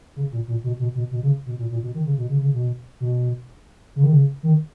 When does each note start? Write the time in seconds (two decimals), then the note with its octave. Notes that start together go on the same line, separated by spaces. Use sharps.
0.16 C#3
0.32 A#2
0.48 A#2
0.64 B2
0.79 B2
0.95 B2
1.11 B2
1.23 C#3
1.46 B2
1.58 A#2
1.70 A#2
1.83 B2
1.94 D#3
2.06 C#3
2.17 B2
2.29 C#3
2.42 C#3
2.54 B2
3.00 B2
3.96 C#3
4.04 D#3
4.12 C#3
4.43 D#3